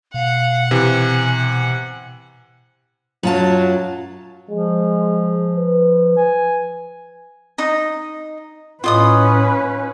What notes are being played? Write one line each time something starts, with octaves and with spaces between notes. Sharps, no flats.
B2 F5 F#5
C3 E3 G#5
F#2 F#3 F4 A5
F3 G#3
B4
G#5
D#4 D#5 A#5
A2 C#4 F4 B4 D#5 D#6